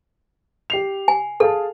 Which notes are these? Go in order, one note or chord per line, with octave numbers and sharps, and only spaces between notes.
G4 C7 F7
G#5
G#4 A4 F5 A5